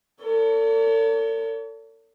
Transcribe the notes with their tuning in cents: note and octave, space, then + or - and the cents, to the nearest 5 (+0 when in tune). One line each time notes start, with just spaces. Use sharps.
A4 +40 C#5 +45